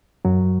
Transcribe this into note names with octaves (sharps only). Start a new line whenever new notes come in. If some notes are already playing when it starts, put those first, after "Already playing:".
F#2 F#3